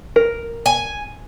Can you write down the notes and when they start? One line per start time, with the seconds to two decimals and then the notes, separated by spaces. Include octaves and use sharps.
0.16 A#4
0.66 G#5